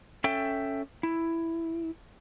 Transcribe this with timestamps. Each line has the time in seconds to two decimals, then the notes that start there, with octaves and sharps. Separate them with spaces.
0.24 C#4 A4 E5 G5
1.03 E4